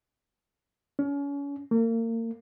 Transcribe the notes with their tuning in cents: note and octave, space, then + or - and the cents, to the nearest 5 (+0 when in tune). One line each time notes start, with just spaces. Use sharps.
C#4 +35
A#3 -35